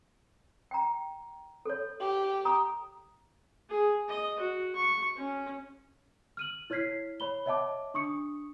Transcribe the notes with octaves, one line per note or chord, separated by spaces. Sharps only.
G5 A#5
A4 C#5
G4
A#5 D#6
G#4
D#5
F#4
C#6
C#4
F6 D#7 F#7
E4 C#5 F6 G#6 B6 C7
C#5 B5 G7
C#5 D#5 E5 F#5 A5 D6
D4 C#6 D#6 C#7